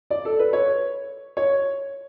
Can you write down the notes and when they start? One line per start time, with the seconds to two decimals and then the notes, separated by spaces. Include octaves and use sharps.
0.11 D5
0.25 A4
0.39 B4
0.53 C#5
1.37 C#5